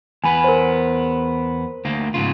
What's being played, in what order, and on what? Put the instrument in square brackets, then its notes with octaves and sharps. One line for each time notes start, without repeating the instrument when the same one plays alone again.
[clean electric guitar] E2 B3 [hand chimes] G#5 B5
[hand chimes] A#4 C5
[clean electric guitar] D2 A#3
G#2 C#3 F4